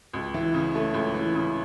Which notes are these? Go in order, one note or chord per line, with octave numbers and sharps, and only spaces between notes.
C#2
E3
C#3
A3
C#2
E3
C#3